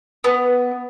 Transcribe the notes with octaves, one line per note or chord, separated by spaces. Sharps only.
B3